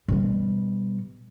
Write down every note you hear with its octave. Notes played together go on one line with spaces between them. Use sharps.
B2 G3